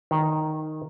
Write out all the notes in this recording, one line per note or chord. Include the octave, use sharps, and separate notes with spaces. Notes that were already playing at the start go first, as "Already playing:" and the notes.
D#3